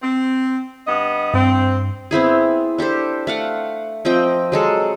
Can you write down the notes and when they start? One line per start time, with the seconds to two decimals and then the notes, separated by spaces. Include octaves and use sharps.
0.02 C4
0.86 G2 B3 D#5
1.34 G2 C4
2.11 B3 C4 E4 G#4
2.78 D4 G4 A4 C5
3.27 A3 F5 F#5
4.05 F3 C4 D#5 G5
4.52 F#3 G#3 A4